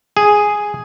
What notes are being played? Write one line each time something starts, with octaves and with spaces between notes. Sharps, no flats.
G#4